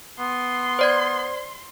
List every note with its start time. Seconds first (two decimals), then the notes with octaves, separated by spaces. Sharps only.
0.19 B3 C6
0.79 C5 D5 G#6